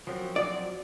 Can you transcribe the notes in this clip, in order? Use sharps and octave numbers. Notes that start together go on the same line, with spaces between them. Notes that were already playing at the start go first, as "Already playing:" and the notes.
F#2 F3 F#3 C4
D5